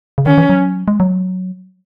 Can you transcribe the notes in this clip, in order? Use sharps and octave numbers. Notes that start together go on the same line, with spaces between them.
C#3
D#3 C#4
E3
F#3
G#3
F#3